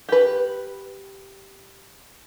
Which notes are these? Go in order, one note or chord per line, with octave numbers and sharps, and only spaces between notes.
G4 B4